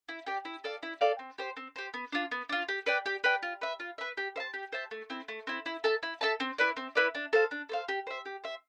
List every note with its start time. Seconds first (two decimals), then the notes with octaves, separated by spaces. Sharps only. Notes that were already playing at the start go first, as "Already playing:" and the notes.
0.09 E4
0.27 G4 D5 G5
0.45 E4
0.64 A4 D5 F5
0.83 E4
1.01 A4 D5 F5
1.19 C4
1.38 G4 C5
1.57 C4
1.76 G4 C5
1.94 B3
2.12 D4 F4
2.31 B3
2.49 D4 F4
2.68 G4
2.86 B4 D5 G5
3.06 G4
3.24 B4 D5 G5
3.43 F4
3.61 B4 E5
3.80 F4
3.98 B4 E5
4.17 G4
4.36 C5 E5
4.40 A5
4.54 G4
4.73 C5 E5 A5
4.91 A3
5.10 C4 E4
5.28 A3
5.47 C4 E4
5.66 E4
5.84 A4 E5 A5
6.03 E4
6.21 A4 E5 A5
6.40 C4
6.58 E4 B4 D5
6.77 C4
6.95 E4 B4 D5
7.15 D4
7.33 A4 C5 F5
7.51 D4
7.69 A4 C5 F5
7.88 G4
8.07 C5 E5
8.26 G4
8.44 C5 E5